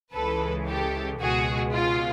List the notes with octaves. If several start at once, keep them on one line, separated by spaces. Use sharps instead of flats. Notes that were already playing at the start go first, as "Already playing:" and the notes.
C#2 C#3 E3 G#3 A4 B4
G4 A4
C#2 B2 G#3 F#4 G#4
F4